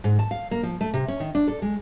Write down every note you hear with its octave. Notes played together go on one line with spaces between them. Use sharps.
G#2
A5
F5
A#3
F3
A3
C3
C#4
D#3
D4
A4
G#3